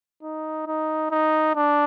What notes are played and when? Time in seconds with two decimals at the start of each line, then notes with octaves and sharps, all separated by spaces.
0.23 D#4
0.67 D#4
1.11 D#4
1.55 D4